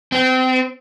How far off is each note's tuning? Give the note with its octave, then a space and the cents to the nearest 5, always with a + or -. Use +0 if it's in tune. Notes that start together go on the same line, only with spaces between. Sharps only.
C4 -30